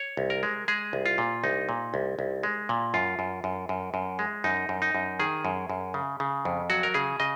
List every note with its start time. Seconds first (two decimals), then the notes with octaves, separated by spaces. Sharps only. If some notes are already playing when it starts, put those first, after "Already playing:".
Already playing: C#5
0.17 C2
0.30 A#4
0.43 G#3
0.68 G#3 G#4
0.93 C2
1.06 F4
1.18 A#2
1.44 C2 D#4
1.69 A#2
1.94 C2
2.19 C2
2.43 G#3
2.69 A#2
2.94 F#2 F4
3.19 F#2
3.44 F#2
3.69 F#2
3.94 F#2
4.19 G#3
4.44 F#2 D#4
4.69 F#2
4.82 D#4
4.95 F#2
5.19 D#3 G#4
5.45 F#2
5.70 F#2
5.94 C#3
6.20 C#3
6.45 F2
6.70 F#3 F#4
6.83 A#4
6.94 C#3 G#4
7.20 C#3 D#5